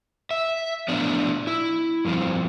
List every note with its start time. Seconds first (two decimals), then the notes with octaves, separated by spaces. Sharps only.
0.31 E5
0.88 A2 F3 B3 D4 D5
1.47 E4
2.05 G2 F3 C4